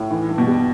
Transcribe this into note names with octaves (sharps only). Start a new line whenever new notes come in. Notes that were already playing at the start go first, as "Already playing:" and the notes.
Already playing: A2
E3
G2
B2
G3